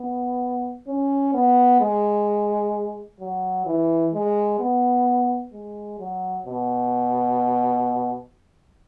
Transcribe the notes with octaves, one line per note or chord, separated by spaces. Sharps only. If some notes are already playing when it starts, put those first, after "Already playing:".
Already playing: B3
C#4
B3
G#3
F#3
E3
G#3
B3
G#3
F#3
B2